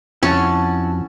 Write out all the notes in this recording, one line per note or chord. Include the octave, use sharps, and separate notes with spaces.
F2 C#4 E4 F#4 A5